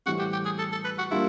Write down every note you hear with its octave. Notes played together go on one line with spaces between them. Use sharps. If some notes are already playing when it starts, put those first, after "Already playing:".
A2 E3 G3 C4 F#4
G4
G4
G#4
A4
A4
B4
F#4
G3 A#3 D4 E4 F4